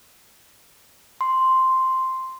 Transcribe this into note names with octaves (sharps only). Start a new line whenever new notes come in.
C6